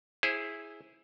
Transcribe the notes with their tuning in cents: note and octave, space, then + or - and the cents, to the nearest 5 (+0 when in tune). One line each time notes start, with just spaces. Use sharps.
E4 -5 G#4 +0 C5 +30